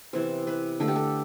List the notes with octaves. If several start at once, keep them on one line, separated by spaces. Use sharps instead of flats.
C3 E3 B3 C5
B4
D3 A3 A4
G4
A4